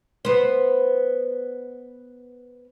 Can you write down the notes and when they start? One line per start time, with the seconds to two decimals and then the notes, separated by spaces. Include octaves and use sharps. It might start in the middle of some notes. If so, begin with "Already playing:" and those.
0.25 B3 C5